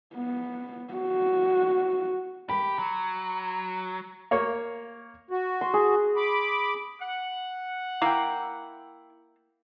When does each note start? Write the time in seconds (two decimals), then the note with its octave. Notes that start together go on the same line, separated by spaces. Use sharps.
0.15 B3
0.94 F#4
2.49 G4 B5
2.79 F#3
4.31 A#3 C#5
5.31 F#4
5.61 C6
5.74 G#4
6.16 B5 D6
7.01 F#5
8.02 A#3 E4 G5